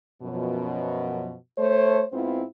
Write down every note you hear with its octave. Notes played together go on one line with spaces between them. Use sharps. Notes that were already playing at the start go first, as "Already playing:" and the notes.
F#2 B2 F3
A3 C5 C#5
G#2 B3 C4 E4 F4 C5